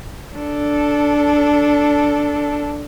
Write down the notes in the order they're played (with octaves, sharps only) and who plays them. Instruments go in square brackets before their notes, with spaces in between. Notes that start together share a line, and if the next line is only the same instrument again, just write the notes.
[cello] D4 A4